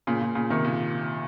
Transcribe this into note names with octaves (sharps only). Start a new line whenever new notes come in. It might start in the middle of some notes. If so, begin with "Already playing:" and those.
A#2 C#3
A#2 C#3
A#2 C#3
C3 D#3
A#2 C#3